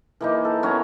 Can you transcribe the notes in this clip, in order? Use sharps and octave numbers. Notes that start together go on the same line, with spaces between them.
E3 A#3 D#4
A4
B3 C#4 C#5 A#5